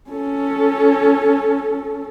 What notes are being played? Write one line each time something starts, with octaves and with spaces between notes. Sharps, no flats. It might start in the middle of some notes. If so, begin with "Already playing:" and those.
C#4 A4